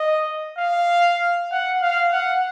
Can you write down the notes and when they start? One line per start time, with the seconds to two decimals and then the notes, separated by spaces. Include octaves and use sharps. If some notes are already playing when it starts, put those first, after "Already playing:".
Already playing: D#5
0.58 F5
1.51 F#5
1.82 F5
2.13 F#5